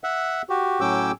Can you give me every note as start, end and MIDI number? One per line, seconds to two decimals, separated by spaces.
0.04 0.42 76
0.04 0.42 78
0.49 0.81 66
0.49 0.81 67
0.81 1.12 45
0.81 1.12 54
0.81 1.12 61
0.81 1.12 79
0.81 1.12 86
0.81 1.12 88